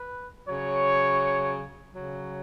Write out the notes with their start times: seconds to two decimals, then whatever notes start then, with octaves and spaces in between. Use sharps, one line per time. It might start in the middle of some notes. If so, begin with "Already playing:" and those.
Already playing: B4
0.47 C#3 F#3 C#5
1.93 C#3 F#3